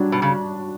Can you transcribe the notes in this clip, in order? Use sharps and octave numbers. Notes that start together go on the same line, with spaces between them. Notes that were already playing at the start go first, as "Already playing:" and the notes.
Already playing: F#3 G3 D4 F#4
B2
C#3